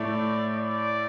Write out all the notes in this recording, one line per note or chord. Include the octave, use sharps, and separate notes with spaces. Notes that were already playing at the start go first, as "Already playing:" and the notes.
Already playing: A2 A3 D5
D5